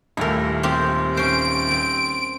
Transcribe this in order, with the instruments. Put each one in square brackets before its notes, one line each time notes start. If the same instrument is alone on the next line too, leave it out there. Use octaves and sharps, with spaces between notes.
[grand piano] D#1 D#2 A3 [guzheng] E4 A#4
[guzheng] C4 F4 G4
[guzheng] C#4 C5 [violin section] D7
[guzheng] C4